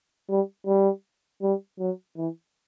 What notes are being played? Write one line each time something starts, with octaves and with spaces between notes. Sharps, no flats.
G3
G3
G3
F#3
E3